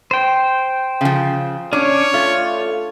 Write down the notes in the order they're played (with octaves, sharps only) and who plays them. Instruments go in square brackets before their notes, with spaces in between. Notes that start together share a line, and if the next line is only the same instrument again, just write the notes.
[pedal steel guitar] C5 G5
[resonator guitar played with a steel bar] C#3 F3
[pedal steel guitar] C#4 [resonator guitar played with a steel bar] D4 [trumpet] C#5
[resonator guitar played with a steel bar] A3 [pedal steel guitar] F4